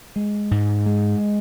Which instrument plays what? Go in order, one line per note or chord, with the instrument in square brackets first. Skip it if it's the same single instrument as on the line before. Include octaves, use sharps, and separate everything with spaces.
[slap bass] G#3
G#2
G#3